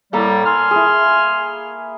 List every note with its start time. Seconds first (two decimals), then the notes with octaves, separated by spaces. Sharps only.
0.13 A2 G3 A#3 A4 A#5
0.46 G#5 C6 F6
0.71 E4 G#4